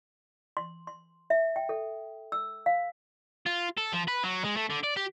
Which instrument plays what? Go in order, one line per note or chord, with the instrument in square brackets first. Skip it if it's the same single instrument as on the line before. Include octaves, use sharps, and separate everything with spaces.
[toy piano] C6
C6
E5
G5
A4
E6
F5
[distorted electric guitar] F4
A4
F3
B4
F#3
G#3
A3
D3
D5
G4